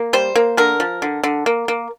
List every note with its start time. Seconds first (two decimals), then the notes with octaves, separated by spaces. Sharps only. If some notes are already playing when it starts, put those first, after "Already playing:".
Already playing: A#3
0.13 G3 C5
0.35 A#3
0.57 D3 A#4
0.80 F3
1.02 D3
1.23 D3
1.46 A#3
1.68 A#3